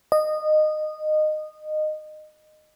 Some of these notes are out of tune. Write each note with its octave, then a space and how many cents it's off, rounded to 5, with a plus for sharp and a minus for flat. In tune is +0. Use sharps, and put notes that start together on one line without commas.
D#5 -20